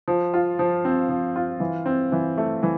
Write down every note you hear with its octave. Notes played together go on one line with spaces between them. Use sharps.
F3
F4
F3
C4
F3
F4
E3
C4
E3
A3
E3